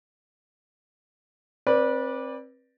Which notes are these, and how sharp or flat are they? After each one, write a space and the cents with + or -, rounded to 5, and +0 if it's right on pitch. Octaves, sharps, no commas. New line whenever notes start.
C4 +25 B4 -25 D5 +0